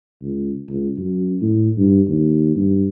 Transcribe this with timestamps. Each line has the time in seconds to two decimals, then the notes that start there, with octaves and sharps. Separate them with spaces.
0.22 C#2
0.69 C#2
0.98 F#2
1.41 A2
1.78 G2
2.08 D#2
2.55 G2